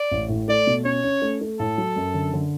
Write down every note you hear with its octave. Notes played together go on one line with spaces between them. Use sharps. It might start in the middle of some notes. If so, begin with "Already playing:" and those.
Already playing: D5
A1
A2
A3 D5
B2
C#4 C#5
C#4
A3
A3
A2 A4
F#3
F#2
D3
D3